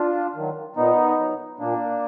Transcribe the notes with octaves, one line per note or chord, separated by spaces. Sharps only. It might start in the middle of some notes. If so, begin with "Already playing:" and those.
Already playing: D4 F4
D#3 F#3
A#2 B3 D#4
F#3
A#2 A#3 D4